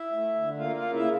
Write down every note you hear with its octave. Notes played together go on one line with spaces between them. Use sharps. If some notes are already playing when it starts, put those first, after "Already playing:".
Already playing: E4 E5
A3
D3
A#3 F4 F5
F4 F5
C#3
E4 E5